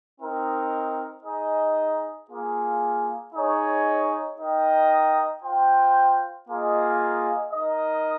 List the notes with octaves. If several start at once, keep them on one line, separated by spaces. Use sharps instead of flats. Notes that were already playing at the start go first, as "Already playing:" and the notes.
C4 D#4 A#4
D#4 G#4 D#5
A#3 F4 G#4
D#4 G#4 C#5
D#4 A#4 D#5 G5
F4 C5 G5
A#3 F4 G#4 D#5
D#4 A#4 D#5